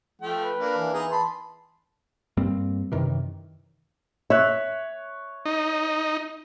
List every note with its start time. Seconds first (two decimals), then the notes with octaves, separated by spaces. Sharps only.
0.21 F3 A3 G5
0.40 B4
0.58 A#3 D4
0.78 E3
0.93 B3 D#4 G#4
1.11 A5 B5 C6
2.37 G2 G3 A#3 C4
2.92 F#2 C3 D#3 E3
4.30 C#5 E5 F#6
5.45 D#4